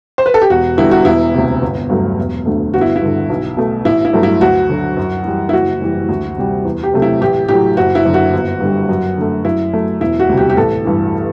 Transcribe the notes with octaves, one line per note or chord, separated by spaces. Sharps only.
C5
B4
A4
G4
E1 F#4
E2 D3 G3 E4
F#4
E1 E4
D2 C3
G1
G2 F#3 A3
E1
D2 D3 A3
G1 F#4
E4
E4
G2 D3
B1
B2 A3
A1 E4
E4
G2 F#3 A3
E4
D2 F#4
D3 F#3
F#2
E3 G3
E4
F#1 F#4
F#2 E3 G3
D2
C3 G3
E2
G4
C3 F#3 A3
E4
A1 G4
A2 F#3 G4
F#1 F#4
E4
F#2 D3
F#4
G1
G2 D3 G3
F#2
D3 A3
F#2 E4
F#3 A3
E1 E4
F#4
D2 C3 G3
G4
G4
A1 A4
G2 E3